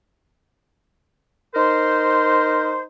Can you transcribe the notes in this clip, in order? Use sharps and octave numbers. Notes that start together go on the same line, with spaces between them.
D#4 A#4 C5